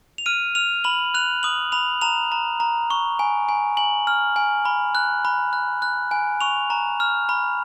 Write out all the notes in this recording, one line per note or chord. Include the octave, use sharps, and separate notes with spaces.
F7
F6 D#7
F6 F7
B5 F#7
F#6 F7
D#6 F#7
B5 F7
A#5 F7
A#5
A#5
C#6
G#5
G#5
G#5 F#7
F6
G#5
B5
F#6
B5
F#6
F#6
G#5
C#6 F7
A#5
F6
B5